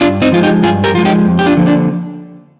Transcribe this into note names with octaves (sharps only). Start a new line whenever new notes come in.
G2 D4 F4
C4 D#4
F3 G#3 F4
D#4 G4
G2 F4 G#4
G4 A#4
F3 G#3 F4
D#4 G4
F2
G4
D4 F4
D3 F3 A#3
D4